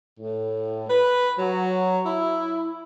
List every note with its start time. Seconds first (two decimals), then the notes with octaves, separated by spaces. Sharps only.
0.20 A2
0.89 B4
1.39 F#3
2.06 E4